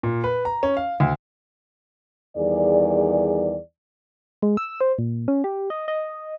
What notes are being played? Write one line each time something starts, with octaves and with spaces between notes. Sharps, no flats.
A#2
B4
A#5
C#4
F5
D2
E2 D#3 G3 G#4 D5
G#3
E6
C5
A#2
C#4
G4
D#5
D#5